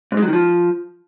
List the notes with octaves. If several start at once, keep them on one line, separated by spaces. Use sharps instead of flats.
G#2
G#3
F#3
D#3
F3